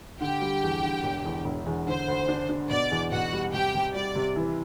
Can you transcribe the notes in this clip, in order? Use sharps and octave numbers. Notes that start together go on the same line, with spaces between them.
D3 G4 G5
G3
E2
D3
E1
E2
E1
E2
D3 C5
D2
D4
D4
B2 D5
E2
B2 F#4 F#5
G3
C3 G4 G5
C3
G3 D5
C3
E3